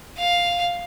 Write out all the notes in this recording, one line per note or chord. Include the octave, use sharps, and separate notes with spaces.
F5